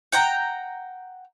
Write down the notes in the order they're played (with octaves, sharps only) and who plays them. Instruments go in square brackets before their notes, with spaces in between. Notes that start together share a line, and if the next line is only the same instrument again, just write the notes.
[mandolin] F#5 G5 A#5